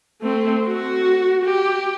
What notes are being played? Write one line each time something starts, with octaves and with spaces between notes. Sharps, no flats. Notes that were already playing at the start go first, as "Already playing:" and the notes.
A3 C4
F#4
G4